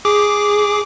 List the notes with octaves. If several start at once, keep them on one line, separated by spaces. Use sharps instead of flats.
G#4 D6